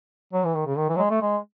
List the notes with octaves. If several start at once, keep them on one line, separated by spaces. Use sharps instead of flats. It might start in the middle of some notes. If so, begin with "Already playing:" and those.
F#3
E3
D#3
C#3
D#3
E3
F#3
G#3
A3
G#3